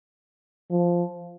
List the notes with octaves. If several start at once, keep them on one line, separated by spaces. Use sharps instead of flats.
F3